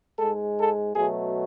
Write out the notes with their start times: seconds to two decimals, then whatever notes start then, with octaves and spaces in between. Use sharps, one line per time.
0.18 G#2 G#3 A4
0.57 A4
0.94 B2 F#3 A3 G#4